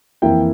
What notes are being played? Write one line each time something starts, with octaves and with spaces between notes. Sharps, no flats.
F2 E3 A#3 E4 G5